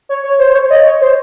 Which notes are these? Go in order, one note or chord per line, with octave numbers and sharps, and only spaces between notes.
C#5
C#5
C5
C5
C#5
D#5
C#5
C5